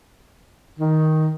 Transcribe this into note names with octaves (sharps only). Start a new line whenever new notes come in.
D#3